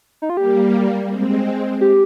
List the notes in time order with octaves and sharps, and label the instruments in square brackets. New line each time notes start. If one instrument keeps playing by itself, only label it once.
[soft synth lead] D#4
F4
[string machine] G3 A#3 [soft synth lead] G4
[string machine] G#3 C4
[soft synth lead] G4